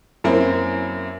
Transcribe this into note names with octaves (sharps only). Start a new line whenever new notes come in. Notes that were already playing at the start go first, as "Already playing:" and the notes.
F#2 A#3 C4 E4